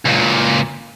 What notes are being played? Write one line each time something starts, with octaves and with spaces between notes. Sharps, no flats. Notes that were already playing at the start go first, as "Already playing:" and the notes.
C#2 A#2